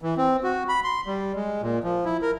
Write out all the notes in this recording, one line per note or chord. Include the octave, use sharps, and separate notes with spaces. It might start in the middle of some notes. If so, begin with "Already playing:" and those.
E3
C4
F#4
B5
C6
G3
G#3
A#2
F3
E4
A#4